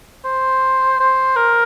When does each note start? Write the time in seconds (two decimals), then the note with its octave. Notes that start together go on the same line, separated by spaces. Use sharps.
0.25 C5
1.00 C5
1.36 A#4